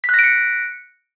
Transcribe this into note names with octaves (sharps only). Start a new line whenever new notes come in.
F#6 A#6 B6 C#7 D7